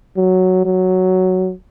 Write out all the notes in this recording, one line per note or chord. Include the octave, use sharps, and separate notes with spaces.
F#3
F#3